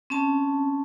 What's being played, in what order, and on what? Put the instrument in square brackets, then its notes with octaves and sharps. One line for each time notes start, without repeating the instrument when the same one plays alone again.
[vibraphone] C4 C#4 A5